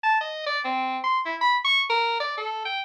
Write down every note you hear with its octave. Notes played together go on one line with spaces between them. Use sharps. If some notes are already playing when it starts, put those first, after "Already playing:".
A5
D#5
D5
C4
C6
E4
B5
C#6
A#4
D5
A4
G5